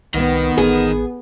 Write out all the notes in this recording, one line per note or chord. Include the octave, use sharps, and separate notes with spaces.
C2 D#3 B3
A1 G#4